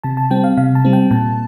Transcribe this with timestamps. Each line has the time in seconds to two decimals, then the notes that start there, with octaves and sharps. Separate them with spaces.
0.04 C3 A5
0.17 A5
0.31 G3 C4 G5
0.44 F5
0.57 C3 F5
0.75 A5
0.85 G3 C4
0.93 G5
1.11 A#2 A5